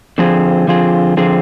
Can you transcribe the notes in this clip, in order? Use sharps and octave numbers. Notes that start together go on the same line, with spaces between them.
D3 F3 C4 F4 G#4
D3 F3 C4 F4 G#4
D3 F3 C4 F4 G#4